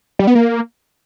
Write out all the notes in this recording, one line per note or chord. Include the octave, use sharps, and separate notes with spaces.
G3
B3
A#3